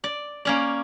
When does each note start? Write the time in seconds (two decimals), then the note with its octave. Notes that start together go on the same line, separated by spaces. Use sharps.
0.04 D5
0.45 A#3 C#4 D5